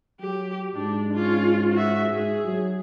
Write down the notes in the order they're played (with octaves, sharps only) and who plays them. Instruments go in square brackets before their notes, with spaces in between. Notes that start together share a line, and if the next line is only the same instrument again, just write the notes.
[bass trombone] F#3 [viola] G4
[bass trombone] G#2 [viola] D4
[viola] C#4 F4
F#4 E5
[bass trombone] G#2 [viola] G#4
[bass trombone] F#3